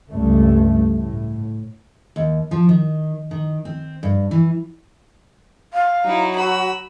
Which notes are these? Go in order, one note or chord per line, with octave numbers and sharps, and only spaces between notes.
C#2 G2 A3
A2
D#2
F3
D#3
D#3
C4
G2
E3
F5
F#3 D#4 E4
F#4 B5 E6